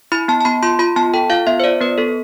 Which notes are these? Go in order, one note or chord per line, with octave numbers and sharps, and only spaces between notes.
E4 B5
B3 A5
A5
B3 B5
F4 C6
F4 B5
B3 A5
A4 G5
F4 F5
B3 E5
C5
F4 D5
B3 B4
B3 A4